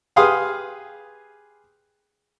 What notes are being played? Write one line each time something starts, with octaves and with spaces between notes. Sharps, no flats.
G4 G#4 B4 F5 C6 D#6